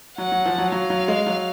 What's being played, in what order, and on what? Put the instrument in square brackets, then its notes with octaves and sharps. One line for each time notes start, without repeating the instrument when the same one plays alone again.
[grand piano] F#3 [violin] F#5
[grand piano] F#3
F3
F#3
[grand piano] F#3 [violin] F5
[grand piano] F#3
G#3
F#3